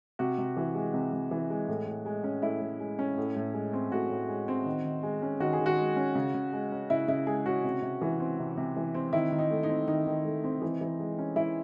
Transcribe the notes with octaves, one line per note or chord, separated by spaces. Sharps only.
C3 F#4
C3
E3
G#3
C3
C3
E3
G#3
A2
A2
G#3
C#4
A2 E4
A2
G#3
C#4
A2
A2
G#3
C4
A2 F#4
A2
G#3
C4
D#3
D#3
G#3
C#4
D#3 F#4
G#4
D#3
F#4
G#3
C#4
C#3
C#3
G#3
C#4
C#3 E4
C#3 E4
G#3 G#4
C#4 F#4
C3
C3
E3
C4
C3
C3
E3
C4
D#3 E4
D#3
D#4
A3
D#4
C4
D#3 D#4
D#3
A3
C4
E3
E3
G#3
C#4
E3 E4